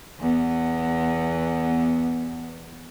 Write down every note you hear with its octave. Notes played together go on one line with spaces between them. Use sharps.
E2 B3